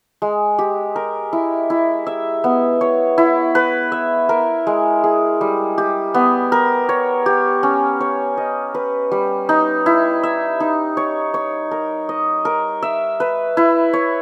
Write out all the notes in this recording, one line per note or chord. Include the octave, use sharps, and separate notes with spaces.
G#3
G4
A#4
E4
E4
E5
B3
C#5
E4
B4
E5
A#4
G#3
G#4
G3
G4
B3
A#4
C#5
G4
C#4
C#5
D#5
B4
G3
D#4
E4
E5
D#4
C#5
C#5
A#4
D#5
A#4
E5
B4
E4
C#5